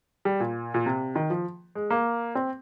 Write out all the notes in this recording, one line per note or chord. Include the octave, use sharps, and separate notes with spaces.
G3
A#2
A#2
C3
D#3
F3
G#3
A#3
C4